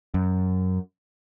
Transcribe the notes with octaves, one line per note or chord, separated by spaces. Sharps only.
F#2